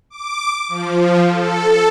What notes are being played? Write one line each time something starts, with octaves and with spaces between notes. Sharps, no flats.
D6
F3
A4